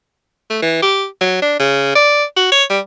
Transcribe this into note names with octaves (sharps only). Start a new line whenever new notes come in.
A3
E3
G4
F#3
D4
C#3
D5
F#4
C#5
G3